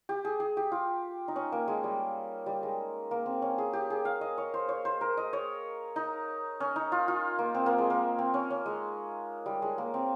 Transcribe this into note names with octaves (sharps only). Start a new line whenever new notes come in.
G4
G#4
G#4
G4
F4
D#4
C#4
A#3
G#3
G3
G3
G#3
A#3
C4
C#4
G#4
G4
G#4
F5
D#5
C#5
C5
C#5
C5
A#4
D#5
C#5
D#4
C#4
D#4
F4
F4
A#3
C4
A#3
G#3
A#3
C4
C#4
C#4
G#3
G3
G#3
A#3
C4